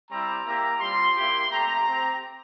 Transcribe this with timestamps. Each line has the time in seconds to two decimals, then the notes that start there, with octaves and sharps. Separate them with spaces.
0.10 G3 C4 E4 G4 A#5
0.45 A#3 E4 G4 A#5
0.80 G3 C4 F4 C6
1.16 A#3 E4 G4
1.51 A3 C4 G4 A#5
1.85 C4 G4